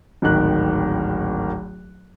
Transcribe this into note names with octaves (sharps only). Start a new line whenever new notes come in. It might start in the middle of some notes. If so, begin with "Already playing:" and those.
D1 G#1 D#3 F#6